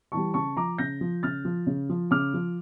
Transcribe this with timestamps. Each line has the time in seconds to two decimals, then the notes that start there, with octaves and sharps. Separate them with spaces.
0.12 E3 G3 A5 C#6
0.34 C#3 A5 C#6
0.57 F3 A#5 D6
0.78 C#3 G6 A#6
1.01 F3
1.23 C#3 F6 A6
1.45 F3
1.67 C#3
1.89 F3
2.11 C#3 D6 F6
2.34 F3